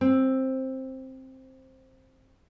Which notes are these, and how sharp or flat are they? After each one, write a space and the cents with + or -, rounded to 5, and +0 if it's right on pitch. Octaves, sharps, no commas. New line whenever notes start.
C4 +10